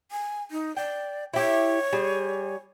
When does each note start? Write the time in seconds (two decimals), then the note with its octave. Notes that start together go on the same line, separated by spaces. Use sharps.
0.11 G#5
0.51 D#4
0.77 D5 G5
1.34 E4 G4 C#5
1.93 G3 G#4